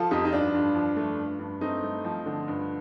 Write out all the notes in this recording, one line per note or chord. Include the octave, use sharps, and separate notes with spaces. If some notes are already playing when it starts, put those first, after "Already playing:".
Already playing: F3 F4 A4
F2 D#4 G4
D#4
G2 D4 F4
G2
F3
A3
G2
G2
A3 C4 D#4
A3
F3
D3
G2